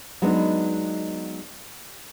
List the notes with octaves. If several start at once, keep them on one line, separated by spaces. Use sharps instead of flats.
F#3 G#3 B3 D4 D#4